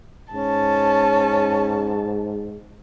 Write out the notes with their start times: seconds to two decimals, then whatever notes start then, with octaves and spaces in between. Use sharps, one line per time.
0.33 G#2 C#4 A5